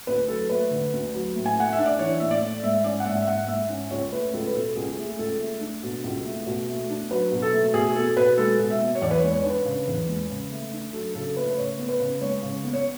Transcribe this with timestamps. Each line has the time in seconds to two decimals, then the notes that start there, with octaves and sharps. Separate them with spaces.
0.07 D2 B4
0.29 F#3 A4
0.50 A3 B4
0.71 D3
0.93 D2
1.14 F#3
1.35 A2
1.46 G#5
1.57 A3 F#5
1.73 E5
1.78 D4
1.86 D5
1.99 E3 C#5
2.20 A2 E5
2.31 D5
2.41 A3
2.63 G#2 E5
2.84 C#4 D5
3.00 F#5
3.06 G#2 E5
3.22 E5
3.26 G#3 F#5
3.48 G#2 E5
3.69 C#4
3.91 C#2 C#5
4.12 A3 B4
4.33 C#2 A4
4.47 B4
4.55 B2 A4
4.76 C#2 G#4
4.97 A3 G#4
5.19 C#2 A4
5.40 A3
5.61 D4
5.83 B2
6.04 C#2
6.25 A3
6.46 B2
6.67 A3
6.90 D4
7.10 F#3 B4
7.32 B2
7.42 A4
7.53 A3
7.74 B2 G#4
7.95 B3 A4
8.16 B2 B4
8.38 G#3 A4
8.59 B2
8.70 E5
8.81 B3
8.95 C#5
9.01 E2 D5
9.11 B4
9.18 G#3 C#5
9.34 C#5
9.44 D4
9.50 B4
9.65 C#3
9.87 E2
10.08 G#3
10.29 C#3
10.51 A3
10.72 D4
10.93 F#3 A4
11.15 C#3 A4
11.37 A3 B4
11.50 B4
11.57 C#3 C#5
11.78 B3
11.89 B4
12.00 C#3
12.21 G#3 C#5
12.42 C#3
12.63 B3
12.73 C#5